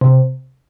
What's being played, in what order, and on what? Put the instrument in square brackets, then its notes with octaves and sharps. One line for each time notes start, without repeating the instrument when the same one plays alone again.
[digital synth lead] C3